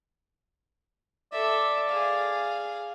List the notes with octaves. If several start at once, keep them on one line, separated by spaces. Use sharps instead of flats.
A4 D5 E5
G#4 F5